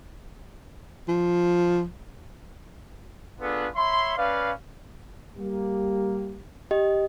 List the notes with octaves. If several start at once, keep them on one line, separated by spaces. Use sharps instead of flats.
F3
B3 D4 F4 G#4 A4 B4
C#5 E5 B5 C6
C#4 B4 D5 F5
G3 A#3 G4
G4 D#5